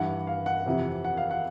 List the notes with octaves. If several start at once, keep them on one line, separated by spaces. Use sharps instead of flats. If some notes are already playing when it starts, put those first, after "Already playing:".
Already playing: G2 E3 F#5
F5
F#5
F2 C3 E3
F#5
F5
F#5